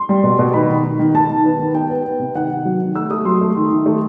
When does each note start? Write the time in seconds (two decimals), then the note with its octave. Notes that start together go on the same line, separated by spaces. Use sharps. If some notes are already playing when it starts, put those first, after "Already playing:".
Already playing: C6
0.09 G3
0.24 B2
0.39 B2
0.54 D#3 B5
0.69 D#3
0.84 D#3
0.99 D#3
1.14 D#3 A5
1.29 D#3
1.45 B3
1.60 D#3
1.74 B3 G5
1.90 B3
2.05 B3
2.19 C3
2.35 D#3 F#5
2.50 D#3
2.65 F#3
2.81 D#3
2.95 A3 E6
3.11 A3 D#6
3.25 F#3 C6
3.41 A3
3.56 D#3
3.71 D#3
3.86 A3